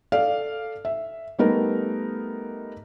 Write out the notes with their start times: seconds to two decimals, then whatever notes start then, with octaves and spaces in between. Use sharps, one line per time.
0.12 A4 D5 F5
0.85 E5
1.38 G3 A3 B3 D#4 A#4